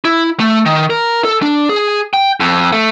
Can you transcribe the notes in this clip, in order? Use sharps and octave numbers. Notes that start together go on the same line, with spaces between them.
E4
A3
D#3
A#4
A4
D4
G#4
G5
F2
A3